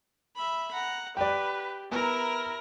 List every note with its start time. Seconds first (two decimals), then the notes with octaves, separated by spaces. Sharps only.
0.35 E5 B5
0.73 F#5 A#5
1.17 G4 B4 D5 G5
1.92 B3 E4 A#4 A#5